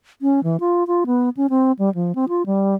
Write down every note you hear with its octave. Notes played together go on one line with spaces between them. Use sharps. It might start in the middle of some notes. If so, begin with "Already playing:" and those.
C#4
E3
F4
F4
B3
C#4
C4
G3
F3
C4
F4
G3